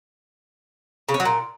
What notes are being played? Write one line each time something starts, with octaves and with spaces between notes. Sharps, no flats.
C#3
C#4
F#3
A#2